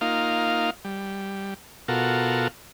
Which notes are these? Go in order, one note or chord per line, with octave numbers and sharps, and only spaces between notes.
A#3 D#4 F4 F5
G3
B2 F4 F#4 A4 A#4